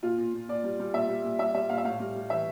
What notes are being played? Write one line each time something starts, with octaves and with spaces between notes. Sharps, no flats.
A#2 F4
A#2
A#2
A#2 D5
G3
G3
A#2 E5
G3
A#2
G3 E5
G3 E5
A#2 F5
E5
A2 F5
G3
G3
E3 E5